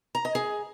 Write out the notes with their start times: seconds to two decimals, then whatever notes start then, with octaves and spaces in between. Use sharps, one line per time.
0.15 A#5
0.25 D#5
0.35 G#4